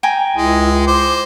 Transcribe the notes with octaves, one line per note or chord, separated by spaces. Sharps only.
G5 G#5 A#5
C#2 G#3 E4
C5 D6